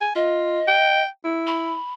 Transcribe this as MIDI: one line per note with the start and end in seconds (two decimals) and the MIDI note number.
0.01 0.11 80
0.15 0.60 65
0.15 1.02 75
0.68 1.07 79
1.25 1.76 64
1.47 1.94 83